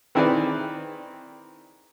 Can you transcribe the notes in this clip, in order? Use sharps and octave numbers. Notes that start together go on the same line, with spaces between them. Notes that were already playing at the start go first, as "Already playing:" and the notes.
D#3 C4 E4 G#4 B4 D5